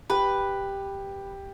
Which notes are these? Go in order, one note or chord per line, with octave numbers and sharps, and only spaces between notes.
G4 B4